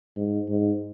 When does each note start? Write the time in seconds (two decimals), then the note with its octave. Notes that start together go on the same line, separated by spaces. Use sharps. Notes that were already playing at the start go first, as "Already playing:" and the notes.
0.17 G#2
0.49 G#2